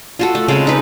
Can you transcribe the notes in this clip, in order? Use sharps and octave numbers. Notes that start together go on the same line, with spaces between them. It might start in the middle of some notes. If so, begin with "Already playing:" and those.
F4 F#4 A4
A3
C#3 G#3 C4 A4
D#4 B4